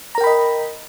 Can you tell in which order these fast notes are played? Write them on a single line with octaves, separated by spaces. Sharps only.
A#5 A#4 G5 B5 D#5